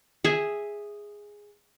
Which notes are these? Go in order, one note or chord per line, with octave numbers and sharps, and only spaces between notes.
G#4 E5